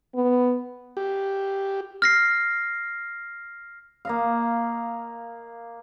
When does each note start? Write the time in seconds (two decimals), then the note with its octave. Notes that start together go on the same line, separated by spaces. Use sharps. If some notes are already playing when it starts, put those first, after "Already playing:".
0.15 B3
0.97 G4
2.02 F6 A#6 C7
4.05 A#3 D#5 F5